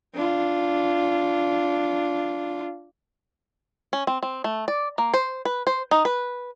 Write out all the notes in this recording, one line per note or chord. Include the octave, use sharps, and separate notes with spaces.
D4 F4
C#4
C4
C4
A3
D5
A#3
C5
B4
C5
D#4
B4